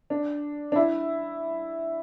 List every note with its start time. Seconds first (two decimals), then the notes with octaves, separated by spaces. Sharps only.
0.10 D4
0.72 D4
0.76 E4